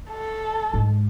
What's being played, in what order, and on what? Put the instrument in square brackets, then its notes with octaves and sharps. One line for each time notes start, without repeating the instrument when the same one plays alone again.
[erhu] A4
[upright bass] G#2 G#3